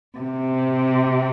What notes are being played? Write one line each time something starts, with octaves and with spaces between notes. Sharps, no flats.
C3